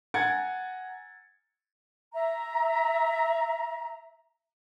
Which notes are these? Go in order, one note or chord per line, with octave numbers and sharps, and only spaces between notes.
F#5 G#5 A#5 G#6 A6 C#7
E5 A#5